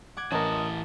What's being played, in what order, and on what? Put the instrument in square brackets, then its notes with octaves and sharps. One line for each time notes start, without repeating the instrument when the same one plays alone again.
[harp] F#5 D6 G#6
[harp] A1 [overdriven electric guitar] E3 A5 [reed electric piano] C#4 A#4 [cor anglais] D#5